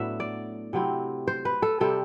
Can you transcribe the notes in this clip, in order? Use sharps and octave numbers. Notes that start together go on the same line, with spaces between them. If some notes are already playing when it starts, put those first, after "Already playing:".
Already playing: A2 F#3 B3 D4 E5 F#5
D5
C3 F#3 C4 E4
C5
B4
A4
C3 G3 C4 A4